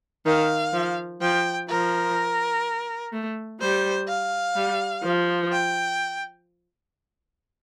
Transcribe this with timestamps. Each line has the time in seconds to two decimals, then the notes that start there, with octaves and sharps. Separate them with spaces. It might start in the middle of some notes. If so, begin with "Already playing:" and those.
0.26 D#3 F5
0.73 F3
1.21 F3 G5
1.69 F3 A#4
3.13 A3
3.60 G3 C5
4.08 F5
4.56 G3
5.04 F3
5.52 G5